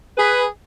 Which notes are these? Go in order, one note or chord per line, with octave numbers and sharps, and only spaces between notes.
G#4 B4